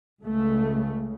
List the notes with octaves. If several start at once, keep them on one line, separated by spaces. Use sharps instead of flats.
C#2 C#3 A3